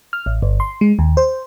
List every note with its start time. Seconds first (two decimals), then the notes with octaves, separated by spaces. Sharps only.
0.13 F6
0.26 A1
0.43 G1
0.60 C6
0.81 G#3
0.99 D#2
1.17 C5